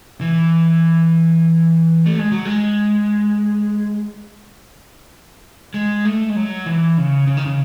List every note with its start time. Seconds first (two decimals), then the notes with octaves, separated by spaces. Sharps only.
0.21 E3
2.06 A3
2.19 G#3
2.32 F#3
2.45 G#3
5.74 G#3
6.05 A3
6.29 G#3
6.36 F#3
6.66 E3
6.98 C#3
7.27 C#3
7.37 D#3
7.46 C#3